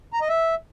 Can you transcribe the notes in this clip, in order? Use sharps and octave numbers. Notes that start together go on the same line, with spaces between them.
A#5
D#5
E5